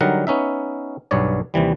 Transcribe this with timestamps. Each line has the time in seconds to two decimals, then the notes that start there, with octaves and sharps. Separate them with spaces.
0.01 D3 F#3 G3 D#4 A#4 F#5
0.27 B3 C#4 D#4 E5
1.11 B1 G2 B3 C#5 D5
1.54 D#2 C3 E3 G3